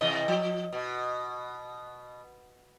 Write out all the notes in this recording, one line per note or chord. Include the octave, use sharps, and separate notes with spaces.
C3 E3 D#5
F3
B2